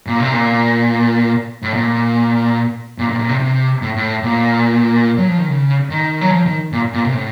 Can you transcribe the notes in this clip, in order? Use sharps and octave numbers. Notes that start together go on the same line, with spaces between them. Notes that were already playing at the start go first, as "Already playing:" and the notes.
A#2
C3
A#2
A2
A#2
A#2
A#2
A#2
C3
C3
A2
A2
A#2
F#3
F3
D#3
C#3
D#3
F#3
F3
D#3
A#2
A#2
C3
A2